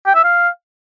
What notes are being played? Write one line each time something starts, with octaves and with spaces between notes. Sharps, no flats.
G5
E5
F5